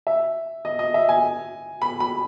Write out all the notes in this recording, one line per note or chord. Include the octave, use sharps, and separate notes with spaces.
E5
D#5
D#5
E5
G#5
B5
B5